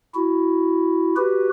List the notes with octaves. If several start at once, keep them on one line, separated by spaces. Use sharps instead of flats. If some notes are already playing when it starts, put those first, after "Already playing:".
E4 F#4
F#4 G4 B4